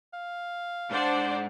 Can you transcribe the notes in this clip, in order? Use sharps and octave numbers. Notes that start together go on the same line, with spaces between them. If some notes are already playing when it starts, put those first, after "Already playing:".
F5
G#2 D4 C5 D5 F#5